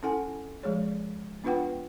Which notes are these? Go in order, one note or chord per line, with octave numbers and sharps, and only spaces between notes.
C#4 E4 A4 F#5 G#5
F3 G#3 G#4 C#5
B3 D4 F4 B4 F#5 G5